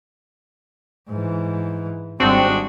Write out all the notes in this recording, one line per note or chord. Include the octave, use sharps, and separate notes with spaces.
G#2 E3
G#1 G3 C4 D4 F#4 G#4